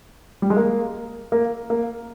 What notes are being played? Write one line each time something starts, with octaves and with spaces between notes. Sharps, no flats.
G3
G#3
A#3
A#3
A#3